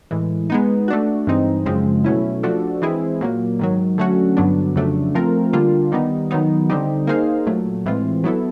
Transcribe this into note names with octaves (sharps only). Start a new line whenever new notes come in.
A2 E3 G#3
G#3 B3 D#4
A3 D4 F#4
G2 E3 G#3 C4 D#4
F#2 C#3 F3 G#3 C4
B2 F#3 A3 C#4 E4
F3 A3 D4 F#4 A4
E3 G#3 C4 E4 G#4
A#2 F#3 A#3
G#2 D#3 F#3
D3 F#3 A3 C#4 F#4
G2 D3 F#3 B3 D4
F2 C#3 F#3 A3 D4
F3 A3 C4 F4 A#4
D3 G3 A#3 D4 F4
D#3 G3 B3 D#4
D#3 F#3 B3 D#4
D3 G3 C4 D#4 G4
A#3 D#4 G#4 C5 F5
A#2 F#3 A3
A2 E3 G#3 C4 F4
F#3 B3 E4 A4